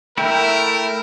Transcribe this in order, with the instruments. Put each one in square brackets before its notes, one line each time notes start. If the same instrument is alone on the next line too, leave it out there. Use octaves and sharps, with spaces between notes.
[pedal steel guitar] A3 E4 [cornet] A#4 [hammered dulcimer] G5